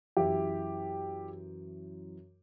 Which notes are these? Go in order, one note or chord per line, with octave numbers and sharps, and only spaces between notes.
F#2 E3 E4 G4